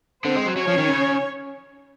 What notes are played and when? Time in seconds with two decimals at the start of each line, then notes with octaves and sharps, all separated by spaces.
0.24 D3 C4 C5
0.35 G#3
0.46 F#3
0.56 F#3 C#4 C#5
0.68 F3
0.78 D#3
0.89 C#3